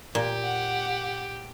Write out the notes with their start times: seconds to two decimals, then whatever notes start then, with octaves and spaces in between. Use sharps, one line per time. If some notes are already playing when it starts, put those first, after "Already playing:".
0.15 A#2 G4
0.44 F#5